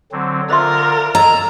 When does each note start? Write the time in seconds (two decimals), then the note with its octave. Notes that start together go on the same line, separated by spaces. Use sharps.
0.12 D3 F#3 C4
0.50 D3 F4 A#4 C5 E5 C6 A6
1.15 D#5 A5 A#5 E6 G#6